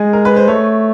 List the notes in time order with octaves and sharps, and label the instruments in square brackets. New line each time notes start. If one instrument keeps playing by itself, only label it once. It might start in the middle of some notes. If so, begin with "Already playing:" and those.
Already playing: [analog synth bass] G#3 [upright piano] G#4
[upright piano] A#4
B4
C5
[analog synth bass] A3 [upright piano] C#5